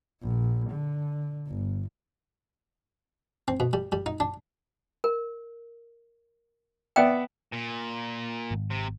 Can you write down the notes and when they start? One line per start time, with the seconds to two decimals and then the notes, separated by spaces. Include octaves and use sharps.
0.22 A#1
0.71 D3
1.48 G1
3.48 C4
3.60 B2
3.73 G3
3.92 G3
4.06 D#4
4.20 D4
5.04 A#4
6.96 B3 D5 E5 G5
7.53 A#2
8.51 G#1
8.71 C3